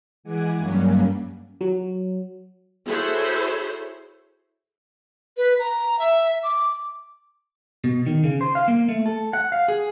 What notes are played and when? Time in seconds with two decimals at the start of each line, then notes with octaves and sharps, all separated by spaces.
0.23 E3 G#3 F#5 G#5 D6
0.58 G2 F#3 G3 A#3 C#4
1.61 F#3
2.85 E4 F#4 G#4 A4 C5 C#5
5.37 B4
5.59 A#5
5.99 E5
6.44 D6
7.84 B2
8.06 D#3
8.24 C#3
8.41 C5
8.55 F5
8.68 A#3
8.88 A3
9.06 A4
9.33 F#5
9.52 F5
9.68 G#4